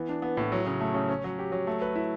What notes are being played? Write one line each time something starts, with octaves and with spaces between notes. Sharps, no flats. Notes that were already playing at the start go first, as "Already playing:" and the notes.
Already playing: E3 B3
D4
B3
A2
F#3
C#3
A3
C#3
C#4
F#3
G4
F#3
A3
B4
E4